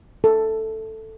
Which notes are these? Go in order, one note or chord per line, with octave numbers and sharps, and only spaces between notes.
A4